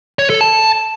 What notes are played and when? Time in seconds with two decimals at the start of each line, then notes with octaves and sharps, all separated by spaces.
0.19 C#5
0.30 A4
0.41 A5